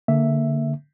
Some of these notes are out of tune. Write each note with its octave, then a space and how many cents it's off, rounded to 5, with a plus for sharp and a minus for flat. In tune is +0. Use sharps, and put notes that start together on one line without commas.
D3 -10 A#3 -15 E5 +0